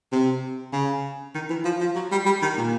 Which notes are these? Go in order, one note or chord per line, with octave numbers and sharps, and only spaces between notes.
C3
C#3
D#3
E3
F3
F3
F#3
G3
G3
D#3
A#2